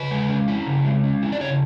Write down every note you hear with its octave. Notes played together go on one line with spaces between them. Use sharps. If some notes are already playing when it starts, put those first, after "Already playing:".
Already playing: C#3 B4
G#3
C#4
E4
C#3
G#3
C#4
E4
D5
C#3 C#5